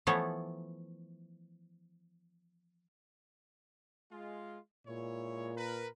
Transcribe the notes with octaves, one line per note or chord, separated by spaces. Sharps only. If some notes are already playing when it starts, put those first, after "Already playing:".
E3 F3 A3 B3 A4 C#5
G#3 F4
A#2 G#3 E4 C#5
A#4 B4